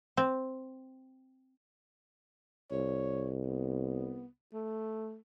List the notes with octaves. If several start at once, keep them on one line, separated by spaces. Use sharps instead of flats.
C4
C2 C#5
B3
A3